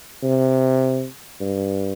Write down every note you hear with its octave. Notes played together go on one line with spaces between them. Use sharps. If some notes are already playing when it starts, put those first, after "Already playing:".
C3
G2